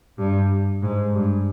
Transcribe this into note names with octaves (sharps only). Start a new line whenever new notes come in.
G2
G#2
G2